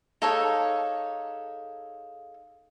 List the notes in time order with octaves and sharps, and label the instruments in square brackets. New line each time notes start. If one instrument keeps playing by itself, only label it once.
[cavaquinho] D#4 A4 C#5 [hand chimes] G#4 F5 D#6